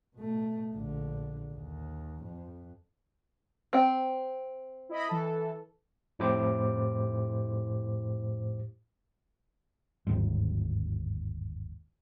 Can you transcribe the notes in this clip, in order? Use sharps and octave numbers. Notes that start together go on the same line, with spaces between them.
B2 A3
A#1 D3
D#2
F2
C4 G5
E4 D#5 B5
E3 A4
F2 A2 E4 G4 C5 D6
G1 D#2 G#2